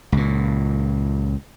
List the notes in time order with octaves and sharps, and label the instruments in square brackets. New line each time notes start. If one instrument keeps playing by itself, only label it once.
[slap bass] C#2 A#2